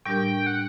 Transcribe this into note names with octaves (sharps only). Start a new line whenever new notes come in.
A2 G3 D4 G4 A#4 G5
F#5